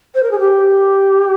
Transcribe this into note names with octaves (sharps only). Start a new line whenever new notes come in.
C5
A#4
G#4
G4